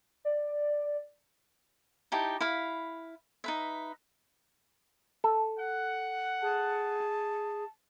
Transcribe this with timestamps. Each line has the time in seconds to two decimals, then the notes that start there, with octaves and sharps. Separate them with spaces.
0.25 D5
2.12 D#4 E4 G4 A5
2.41 E4 F5 B5
3.44 D#4 B4 E5
5.24 A4
5.58 F#5
6.42 G#4 A5